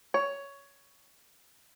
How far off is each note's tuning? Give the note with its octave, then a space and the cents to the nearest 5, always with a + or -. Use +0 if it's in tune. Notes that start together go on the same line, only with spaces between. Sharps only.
C#5 +10